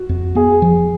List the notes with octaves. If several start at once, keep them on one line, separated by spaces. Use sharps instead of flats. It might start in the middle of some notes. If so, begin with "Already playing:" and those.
Already playing: F#4
F2
B3 G#4
F3